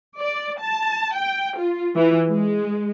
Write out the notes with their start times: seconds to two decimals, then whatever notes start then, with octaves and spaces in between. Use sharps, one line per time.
0.19 D5
0.59 A5
1.14 G5
1.58 F4
1.95 E3
2.28 G#3